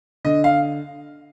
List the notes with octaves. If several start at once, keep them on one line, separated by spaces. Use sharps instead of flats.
D3 D#5
F5